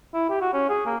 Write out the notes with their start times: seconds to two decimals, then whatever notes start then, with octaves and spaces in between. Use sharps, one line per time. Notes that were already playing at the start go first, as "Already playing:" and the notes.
0.14 E4
0.29 G4
0.41 F#4
0.53 C#4
0.69 G#4
0.86 A#3